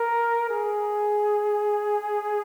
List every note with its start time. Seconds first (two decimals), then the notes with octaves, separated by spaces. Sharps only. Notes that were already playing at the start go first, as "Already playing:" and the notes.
Already playing: A#4
0.49 G#4